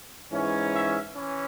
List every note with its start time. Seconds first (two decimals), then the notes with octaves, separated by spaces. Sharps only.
0.32 G#2 E3 C#4
0.73 E5
1.14 E3 C#4